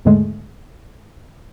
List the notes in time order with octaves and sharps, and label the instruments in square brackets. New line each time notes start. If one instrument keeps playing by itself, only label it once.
[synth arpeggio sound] D#2 G#2 D3 G#3 A3